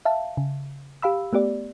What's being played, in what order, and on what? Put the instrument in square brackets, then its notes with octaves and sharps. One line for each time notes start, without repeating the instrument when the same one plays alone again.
[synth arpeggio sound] E5 F5 A5
C#3
G4 F5 B5 E6
A3 B3 G4 D5